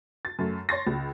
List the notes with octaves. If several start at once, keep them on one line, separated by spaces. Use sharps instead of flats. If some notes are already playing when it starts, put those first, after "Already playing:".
A6
F#2 A3
C#5 C6 A6 A#6
C#2